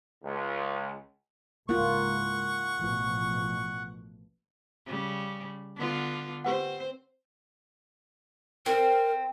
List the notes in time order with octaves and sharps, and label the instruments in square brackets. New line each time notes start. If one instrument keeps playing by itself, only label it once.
[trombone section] C#2
[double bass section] C#2 G#2 E3 [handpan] A#3 F4 [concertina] F#5 [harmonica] C#6
[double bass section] A1 B2 F3
[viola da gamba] C#3 G3
D3 B3 F4
[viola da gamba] C4 C5 [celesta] G4 B4 F#5
[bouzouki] C4 [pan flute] A#4